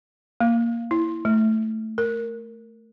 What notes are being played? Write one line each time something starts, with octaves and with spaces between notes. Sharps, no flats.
A#3
E4
A3
A#4